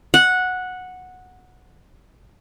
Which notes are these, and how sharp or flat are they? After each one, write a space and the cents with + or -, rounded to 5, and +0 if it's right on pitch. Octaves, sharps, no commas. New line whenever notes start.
F#5 -10